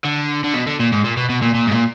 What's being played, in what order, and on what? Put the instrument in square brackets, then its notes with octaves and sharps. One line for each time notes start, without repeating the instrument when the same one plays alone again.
[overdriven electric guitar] D3
D3
B2
D3
A#2
G#2
A#2
B2
B2
A#2
A#2
G#2
A#2